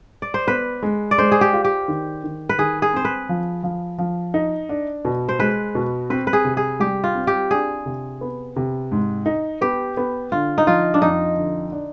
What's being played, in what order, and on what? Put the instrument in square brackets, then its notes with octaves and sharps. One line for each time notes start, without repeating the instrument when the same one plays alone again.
[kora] D5
C5
[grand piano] B3 [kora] B4
[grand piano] G#3
[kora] D5
[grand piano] G#3 [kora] C5
[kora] G#4
G4
[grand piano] F4
[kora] G4
[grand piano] D#3
D#3
[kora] B4
[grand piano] D#3 [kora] G#4
[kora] G#4
[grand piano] C4 [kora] C5
[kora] B4
[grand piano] F3
F3
F3
D#4
D4
B2
[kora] C5
[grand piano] G#3 [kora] B4
[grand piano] B2
[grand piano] C4 [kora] B4
[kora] B4
G#4
[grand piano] C3
[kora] G#4
[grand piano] G3 [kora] G4
[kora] F4
[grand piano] C4
[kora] G4
[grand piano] D4 [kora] G#4
[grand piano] C3
B3
C3
G#2
D#4
[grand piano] B3 [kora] G4
[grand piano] B3
[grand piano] D3 [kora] F4
[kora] D#4
[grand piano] F3 [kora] F4
[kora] D4
[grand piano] F2 [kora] D#4
[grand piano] D3
D4